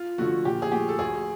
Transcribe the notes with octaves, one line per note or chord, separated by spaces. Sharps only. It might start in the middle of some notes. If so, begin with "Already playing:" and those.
Already playing: F4
D3 F3 A3 F#4
A#2 G4
G#4
F3 A3 G4
A4
D2 G#4